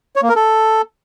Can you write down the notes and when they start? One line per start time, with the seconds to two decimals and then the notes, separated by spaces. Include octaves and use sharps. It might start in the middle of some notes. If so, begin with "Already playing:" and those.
0.16 C#5
0.23 A#3
0.29 A#4
0.36 A4